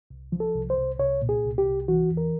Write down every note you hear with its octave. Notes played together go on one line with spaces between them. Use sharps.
C2
F3
A4
C2
C5
C2
C2 C#5
A#2
G#4
C2
G4
C2
E3 F#4
E2
A#4